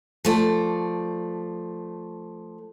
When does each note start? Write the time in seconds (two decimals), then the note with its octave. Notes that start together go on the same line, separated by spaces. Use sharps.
0.25 F3 A3 D5